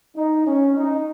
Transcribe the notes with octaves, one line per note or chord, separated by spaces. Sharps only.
D#4
C#4
D#4